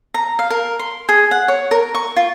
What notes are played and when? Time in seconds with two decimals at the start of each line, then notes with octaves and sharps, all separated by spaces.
0.14 A#5
0.39 F5
0.50 A#4
0.79 C6
1.09 G#4
1.31 F#5
1.48 C#5
1.71 A#4
1.95 C#6
2.16 F4